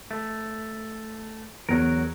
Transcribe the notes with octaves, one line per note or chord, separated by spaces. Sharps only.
A3
E2 F#3 A#4